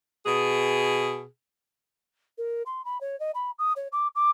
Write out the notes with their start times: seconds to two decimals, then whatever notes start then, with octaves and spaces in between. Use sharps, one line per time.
0.25 B2 G#4
2.38 A#4
2.66 C6
2.85 B5
3.01 C#5
3.20 D#5
3.34 B5
3.59 D#6
3.76 C#5
3.92 D6
4.15 D6